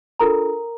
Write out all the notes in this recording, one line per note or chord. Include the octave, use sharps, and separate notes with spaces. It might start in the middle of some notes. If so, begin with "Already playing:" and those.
D4 F4 A4 A#4 A#5